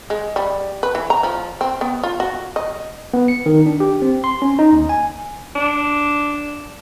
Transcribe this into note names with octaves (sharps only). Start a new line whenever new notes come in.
G#3
G3
B4
E3
A#5
F3
C4
B3
F4
F#4
D#5
B3
C#7
D#3
D4
G4
C4
C6
C#4
D#4
D#2
G#5
D4